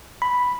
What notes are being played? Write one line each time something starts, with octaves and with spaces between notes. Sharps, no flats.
B5